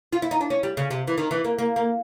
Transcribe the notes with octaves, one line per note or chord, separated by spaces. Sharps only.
F4
E4
D#4
D4
C#4
G3
C#3
C3
E3
D#3
E3
A#3
A#3
A#3